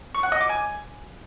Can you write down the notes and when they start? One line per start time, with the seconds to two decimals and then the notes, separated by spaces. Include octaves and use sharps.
0.15 C#6
0.23 F#5
0.32 D#5
0.41 D6
0.49 G#5